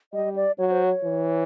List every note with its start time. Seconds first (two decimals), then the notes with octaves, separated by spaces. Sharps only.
0.13 G3 D#5
0.36 D5
0.58 F#3 C#5
0.71 C5
0.84 C#5
1.04 E3